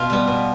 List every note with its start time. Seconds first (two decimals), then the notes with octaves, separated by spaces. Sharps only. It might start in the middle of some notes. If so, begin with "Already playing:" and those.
Already playing: B2 F4
0.10 G3 B3
0.28 B2